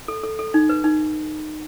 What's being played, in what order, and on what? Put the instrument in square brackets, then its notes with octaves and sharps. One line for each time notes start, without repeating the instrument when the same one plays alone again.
[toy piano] A4
A4
A4
D#4
B4
D#4